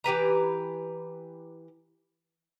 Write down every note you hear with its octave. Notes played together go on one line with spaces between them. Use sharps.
E3 G4 B4 A#5